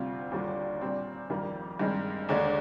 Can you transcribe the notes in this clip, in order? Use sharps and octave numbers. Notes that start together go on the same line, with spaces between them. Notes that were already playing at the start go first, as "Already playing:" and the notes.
Already playing: D2 C3 G3 C4 F4
D#2 D3 G3 D4 F4
A#2 G3 C4
F2 D#3 G3 A#3
G2 D#3 G#3 C4
D#2 D3 G#3 D4